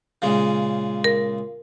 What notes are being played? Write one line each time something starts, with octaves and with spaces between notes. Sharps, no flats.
A#2 C#3 G#3
A#4